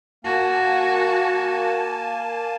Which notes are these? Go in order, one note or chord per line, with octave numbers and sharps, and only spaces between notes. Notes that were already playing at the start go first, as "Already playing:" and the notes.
A#3 F#4 G#5 A5